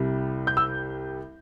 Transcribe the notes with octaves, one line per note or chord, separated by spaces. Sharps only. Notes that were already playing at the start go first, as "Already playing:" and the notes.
Already playing: C2 C3 G3
G6
E6